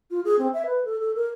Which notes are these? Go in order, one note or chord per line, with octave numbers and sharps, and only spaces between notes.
F4
G#4
C4
E5
B4
A4
A4
A#4